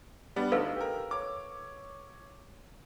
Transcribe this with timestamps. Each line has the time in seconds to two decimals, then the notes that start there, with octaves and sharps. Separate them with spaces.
0.36 G3 B3 D4
0.52 D2 D#4 A4 B4 F5 E6
0.76 G4 A#4
1.11 C#5 D6